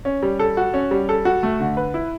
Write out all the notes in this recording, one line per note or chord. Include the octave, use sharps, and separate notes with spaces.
C#4
G3
A4
F#4
C#4
G3
A4
F#4
A3
D3
B4
E4